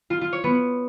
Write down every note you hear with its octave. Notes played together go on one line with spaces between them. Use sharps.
F4
F4
C#5
B3